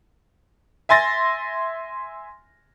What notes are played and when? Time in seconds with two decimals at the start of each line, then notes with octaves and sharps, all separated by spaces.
0.89 E5 G#5 C6 A6 A#6